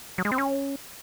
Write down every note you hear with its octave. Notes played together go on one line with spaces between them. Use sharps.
F#3
G#3
C4
C#4